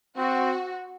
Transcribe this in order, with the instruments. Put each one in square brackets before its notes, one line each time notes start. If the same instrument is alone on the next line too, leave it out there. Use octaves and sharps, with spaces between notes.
[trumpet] C4 [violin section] F#4